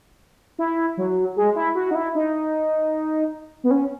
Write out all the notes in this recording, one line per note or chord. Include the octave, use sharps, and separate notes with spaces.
E4
F#3
G#3
E4
F#4
D#4
E4
D#4
B3
C#4